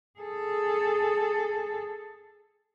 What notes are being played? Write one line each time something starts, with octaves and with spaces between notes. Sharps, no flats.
G#4 A4